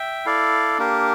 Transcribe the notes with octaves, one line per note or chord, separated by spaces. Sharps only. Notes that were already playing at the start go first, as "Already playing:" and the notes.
Already playing: E5 G5
E4 A4 D5 F5
A#3 D4 G4 A#4